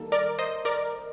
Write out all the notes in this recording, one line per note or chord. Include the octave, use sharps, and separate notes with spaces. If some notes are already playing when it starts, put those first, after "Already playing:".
Already playing: D#3 G3 A#3 A4
A#4 D5
C5 D#5
A#4 D5